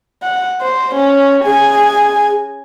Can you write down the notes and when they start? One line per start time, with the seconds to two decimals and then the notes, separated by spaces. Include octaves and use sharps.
0.23 F#5
0.62 C5
0.95 C#4
1.46 G#4 G#5